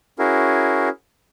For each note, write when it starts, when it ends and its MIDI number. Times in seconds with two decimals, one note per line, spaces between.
0.19 0.89 61
0.19 0.89 64
0.19 0.89 66
0.19 0.89 68
0.19 0.89 70